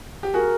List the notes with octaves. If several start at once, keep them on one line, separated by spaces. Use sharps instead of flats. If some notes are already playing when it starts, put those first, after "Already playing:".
G4
F#4 G#4 A#4